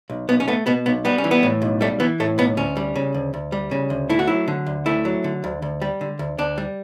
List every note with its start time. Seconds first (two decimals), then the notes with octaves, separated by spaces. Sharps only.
0.10 B1
0.29 B1 B3
0.40 C#4
0.48 A3 B3
0.66 B2 B3
0.86 B1 B3
1.05 G3 B3
1.18 C#4
1.24 E3
1.31 B3
1.43 A2
1.62 B1
1.81 G3 A3
2.00 E3 B3
2.20 A2 A3
2.38 B1 B3
2.57 D2 C#4
2.77 G3
2.96 C#3
3.14 D2
3.34 D2
3.52 G3
3.71 C#3
3.90 D2
4.09 A3 E4
4.19 F#4
4.27 F#3 E4
4.48 D3
4.66 D2
4.86 A3 E4
5.05 F#3
5.24 D3
5.44 D2
5.62 D2
5.82 G3
6.01 D3
6.19 D2
6.38 D2 D4
6.58 G3